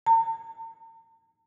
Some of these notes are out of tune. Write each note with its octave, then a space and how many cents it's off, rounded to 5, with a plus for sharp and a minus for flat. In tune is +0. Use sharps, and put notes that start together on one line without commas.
A#5 -45